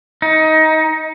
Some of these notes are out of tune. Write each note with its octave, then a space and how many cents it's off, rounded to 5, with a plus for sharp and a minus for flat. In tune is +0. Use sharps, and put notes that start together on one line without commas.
D#4 +20